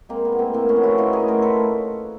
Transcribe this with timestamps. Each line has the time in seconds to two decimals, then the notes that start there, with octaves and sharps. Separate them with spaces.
0.09 G#3 A#3 C4
0.25 B3
0.32 A2
0.39 A#3 C4
0.53 A2 A#3 C4
0.69 B3 C#4
0.76 F3
0.83 E4 F#4
0.98 A2 D#4 F4
1.13 G#4 A#4
1.20 A2
1.28 A#4 C5
1.42 A2 A4 B4